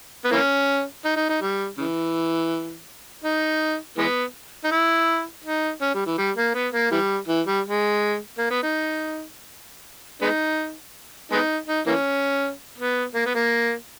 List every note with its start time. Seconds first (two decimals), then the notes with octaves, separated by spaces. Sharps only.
0.25 B3
0.31 E3 A#3 C#4
1.05 D#4
1.16 D#4
1.29 D#4
1.41 G3
1.77 C#3 E3
3.24 D#4
3.98 E3 G#3 B3
4.64 D#4
4.72 E4
5.44 D#4
5.81 C#4
5.94 G3
6.06 E3
6.18 G3
6.37 A#3
6.54 B3
6.73 A#3
6.91 E3 G3
7.28 E3
7.47 G3
7.65 G#3
8.38 A#3
8.50 B3
8.63 D#4
10.22 G#3 B3 D#4
11.32 G#3 B3 D#4
11.68 D#4
11.86 E3 A#3 C#4
12.78 B3
13.15 A#3
13.26 B3
13.35 A#3